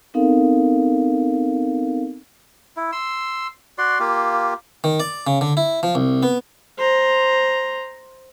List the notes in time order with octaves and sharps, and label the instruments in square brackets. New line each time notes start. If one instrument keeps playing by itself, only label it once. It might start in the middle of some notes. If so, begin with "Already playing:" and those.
[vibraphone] B3 C4 D#4 A4 A#4 F5
[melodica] E4
C6 E6
F#4 D5 C6
A#3 F4 G4
[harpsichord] D#3
D5
C#3
D3
E4
F3
C2
B3
[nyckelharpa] C5 A#5